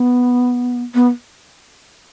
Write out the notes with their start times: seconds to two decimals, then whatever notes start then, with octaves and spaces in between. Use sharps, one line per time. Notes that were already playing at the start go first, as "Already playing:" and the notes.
Already playing: B3
0.94 B3